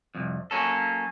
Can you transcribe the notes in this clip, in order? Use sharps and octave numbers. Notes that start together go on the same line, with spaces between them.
C2 F2
F#3 A#3 C#4 A4